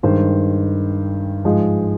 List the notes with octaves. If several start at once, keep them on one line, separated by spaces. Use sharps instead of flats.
G2 D#3 G#3 C5
G#2 F3 G#3